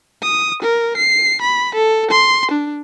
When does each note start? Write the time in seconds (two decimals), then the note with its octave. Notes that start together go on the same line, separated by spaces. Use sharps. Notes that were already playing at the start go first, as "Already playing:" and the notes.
0.23 D#6
0.62 A#4
0.97 C7
1.42 B5
1.75 A4
2.11 C6
2.51 D4